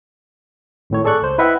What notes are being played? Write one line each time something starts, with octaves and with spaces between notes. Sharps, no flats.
G#1 A2 C#5
G#4 A4 D5 C#6 F#6
C#2 C5
E4 B4 D#5 E5 F#5 G5